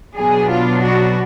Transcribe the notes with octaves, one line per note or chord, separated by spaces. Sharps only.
B2 F#3 B3 D4 G#4
F4
F#4